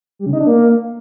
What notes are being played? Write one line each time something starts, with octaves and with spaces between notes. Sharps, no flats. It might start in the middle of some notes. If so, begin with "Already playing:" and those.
G3
C#3
D#4
D4
A#3